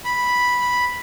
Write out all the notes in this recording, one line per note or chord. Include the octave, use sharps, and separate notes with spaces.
B5